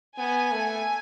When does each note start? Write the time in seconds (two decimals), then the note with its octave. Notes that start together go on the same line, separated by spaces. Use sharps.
0.18 B3 G#5
0.53 A3